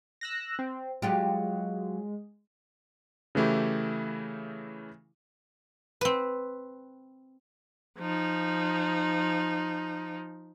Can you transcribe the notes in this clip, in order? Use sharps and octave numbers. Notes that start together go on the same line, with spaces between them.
E6 F#6 A#6
C4
F#3 G#3 F4 G4
C#3 E3 A3 E4 G4
C4 B4
F3 D#4